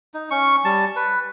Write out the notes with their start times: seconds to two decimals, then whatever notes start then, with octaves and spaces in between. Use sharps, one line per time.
0.14 D#4
0.31 C#4 C#6
0.65 G3 A5
0.96 B4